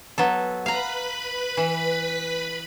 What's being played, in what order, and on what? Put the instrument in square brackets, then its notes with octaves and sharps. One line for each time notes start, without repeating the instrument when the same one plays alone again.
[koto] F#3 B3 A4
[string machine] B4 B5 [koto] F5 A#5
[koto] E3